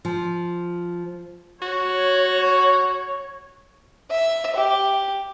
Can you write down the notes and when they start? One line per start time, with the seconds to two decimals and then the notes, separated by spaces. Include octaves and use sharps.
0.05 F3
1.62 F#4 C#5
4.10 E5
4.56 G4